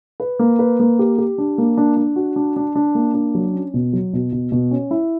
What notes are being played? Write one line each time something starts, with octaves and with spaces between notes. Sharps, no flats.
B4
A#3
B4
A#3
G4
G4
D4
A#3
D4
D4
F#4
D4
D4
D4
A#3
D4
F#3
C#4
B2
F#3
B2
B2
B2
C#4
E4